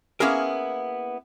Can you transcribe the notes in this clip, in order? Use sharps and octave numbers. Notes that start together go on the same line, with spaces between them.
A#3 B3 C#4 E4 G#4 A#4